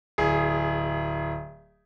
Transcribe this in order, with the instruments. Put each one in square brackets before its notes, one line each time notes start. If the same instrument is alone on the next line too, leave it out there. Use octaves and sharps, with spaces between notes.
[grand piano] D1 G#4